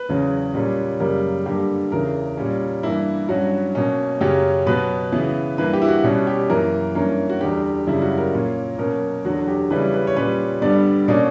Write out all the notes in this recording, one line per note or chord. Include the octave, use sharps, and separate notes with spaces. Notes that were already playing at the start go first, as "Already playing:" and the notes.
Already playing: B4
E2 C#3 F#3 C#4
A#2 G3 A#3 C#4
F#2 C#3 G3 A#3 A#4
G2 D3 G3 A#3 G4
E2 C#3 E3 A#4
A#2 G3 C#4
G2 E3 A#3 E4
G2 F#3 C#4 F#4
B2 A#3 C#4
F#2 C#3 F#3 C#4 G4
B2 F#3 B3 B4
C#3 E3 B3
G2 E3 A#3 B4
G4
E4
F#4
B2 G3 C#4
G4
F#2 E3 A#3 A#4
G2 E3 A#3 C#4 A#4
F#4
E2 D3 G3 G4
F#2 C#3 G3 E4
F#4
A#4
A#2 A#3 C#4
B2 F#3 A#3 C#4 A#4
E2 D3 F#3 F#4
G4
C#3 E3 G3 C#4 B4
B4
C#5
A#2 G3 C#4 B4
G2 D3 G3 B3 D5
B2 A#3 C#4 D5